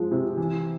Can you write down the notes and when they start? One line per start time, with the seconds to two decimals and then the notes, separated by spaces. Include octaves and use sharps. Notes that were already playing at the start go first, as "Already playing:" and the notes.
Already playing: F3 G#3
0.11 C3
0.37 E3